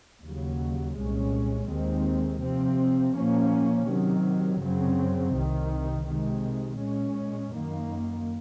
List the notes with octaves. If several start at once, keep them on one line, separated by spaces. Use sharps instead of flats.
D#2 C#3 F#3
C2 A#2 G#3 C#4
D#2 D#3 G#3 C4
C3 F3 C4
A#2 F3 A#3 C#4
C3 D#3 F#3
F#2 C#3 F#3 C4
C2 C3 D#3
C3 D#3 G#3
A#2 G#3 C#4
F#2 D#3 A#3